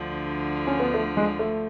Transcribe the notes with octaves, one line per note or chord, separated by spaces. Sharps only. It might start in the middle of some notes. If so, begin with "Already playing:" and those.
Already playing: D2 D3 F3
C#4
B3
A3
G#3
A3